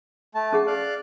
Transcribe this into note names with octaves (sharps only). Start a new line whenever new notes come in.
A3 A5
C#4 G#4 F#5
D5 F5 F#6